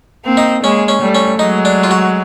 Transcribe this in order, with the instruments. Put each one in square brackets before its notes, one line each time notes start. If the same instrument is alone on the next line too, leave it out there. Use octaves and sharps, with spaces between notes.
[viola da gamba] A#3 C4
[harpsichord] D#4
[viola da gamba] G#3 A#3 [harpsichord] C#4
[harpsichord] C#4
[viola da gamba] G3 A3
[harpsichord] C#4
[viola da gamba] F#3 G#3 [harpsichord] D#4
[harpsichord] D4
F4
F#4